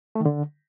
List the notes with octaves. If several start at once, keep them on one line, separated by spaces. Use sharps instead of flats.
A3
D#3
D3